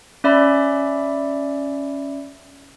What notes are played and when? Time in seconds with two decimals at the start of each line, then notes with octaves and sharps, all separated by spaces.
0.24 C#4 D5 E5 B5